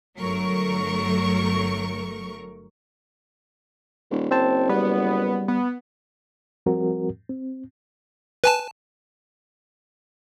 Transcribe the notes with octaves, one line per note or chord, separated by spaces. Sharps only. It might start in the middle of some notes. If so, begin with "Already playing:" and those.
G1 F#3 A3 A#4 C#6
D#1
F#1 C4 C5 A5
G3 B3
B3
F3 G3 C4 F#4 A#4
C4
B4 G#5 A5